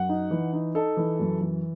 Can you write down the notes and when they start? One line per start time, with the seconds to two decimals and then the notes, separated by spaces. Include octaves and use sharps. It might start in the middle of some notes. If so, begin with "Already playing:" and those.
Already playing: F#2 F#5
0.09 D#4
0.31 E3
0.53 D#4
0.75 D#4 A4
0.97 E3
1.20 F#2
1.41 E3